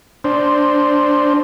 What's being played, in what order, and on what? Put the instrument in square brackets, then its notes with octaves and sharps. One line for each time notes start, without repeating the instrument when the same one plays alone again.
[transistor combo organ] D4 C5